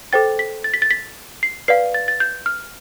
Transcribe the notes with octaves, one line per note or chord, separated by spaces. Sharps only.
A4 C5 G5 A6
B6
A6
B6
A6
B6
C7
B4 D5 F5 C7
A6
A6
G6
F6